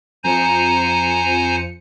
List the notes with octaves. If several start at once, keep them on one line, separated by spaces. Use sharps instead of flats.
F2 F3 C5 G#5 A#5 C#7